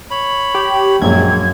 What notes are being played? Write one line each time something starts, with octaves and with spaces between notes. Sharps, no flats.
C#5 B5
G4
A#1 F#2 F#3 G#3 C4 G#6